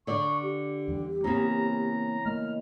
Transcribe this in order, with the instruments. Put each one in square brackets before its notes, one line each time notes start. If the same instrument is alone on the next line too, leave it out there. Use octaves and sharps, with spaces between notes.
[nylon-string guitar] D3 D5 [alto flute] C#6
[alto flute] G4
[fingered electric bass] E2 G3
[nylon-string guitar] E2 C#3 [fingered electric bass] A#3 C4 C#4 [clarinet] A#5
[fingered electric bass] A3 A#3 [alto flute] D#5 [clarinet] F6